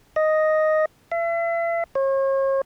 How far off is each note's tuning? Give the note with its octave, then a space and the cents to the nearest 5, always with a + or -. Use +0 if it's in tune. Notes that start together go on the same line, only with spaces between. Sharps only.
D#5 +0
E5 +40
C#5 -40